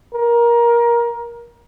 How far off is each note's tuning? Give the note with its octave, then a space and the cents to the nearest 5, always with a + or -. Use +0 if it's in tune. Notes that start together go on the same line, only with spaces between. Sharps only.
A#4 +20